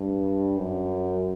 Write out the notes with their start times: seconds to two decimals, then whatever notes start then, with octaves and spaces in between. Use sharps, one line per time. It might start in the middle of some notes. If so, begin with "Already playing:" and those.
Already playing: G2
0.58 F#2